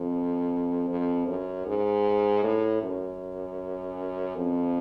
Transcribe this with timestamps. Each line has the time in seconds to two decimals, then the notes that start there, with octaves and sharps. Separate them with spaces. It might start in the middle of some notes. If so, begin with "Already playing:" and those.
Already playing: F2
0.89 F2
1.27 F#2
1.66 G#2
2.43 A2
2.82 F#2
4.36 F2